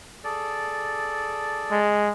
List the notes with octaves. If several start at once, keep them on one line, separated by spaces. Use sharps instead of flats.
G#4 A4 D5
G#3